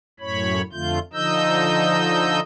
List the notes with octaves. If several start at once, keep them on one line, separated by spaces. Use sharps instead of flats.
F#2 A2 C#5 B5
F2 D3 A3 F4 G6
D3 F3 D#4 D#5 E6 G6